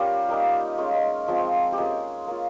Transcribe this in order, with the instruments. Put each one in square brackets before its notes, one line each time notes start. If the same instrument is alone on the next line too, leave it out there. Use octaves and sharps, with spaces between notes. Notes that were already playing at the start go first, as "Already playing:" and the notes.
Already playing: [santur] G3 C#4 F4 G4 A#4
G3 A#3 D#4
G#3 C#4 F4
F3 G#3 C4 F4
G4
G#3 A#3 C#4 F4 G#4
A#3 C#4 F4